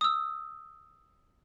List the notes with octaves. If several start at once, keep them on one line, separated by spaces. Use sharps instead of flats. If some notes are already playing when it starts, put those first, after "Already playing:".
D#6 E6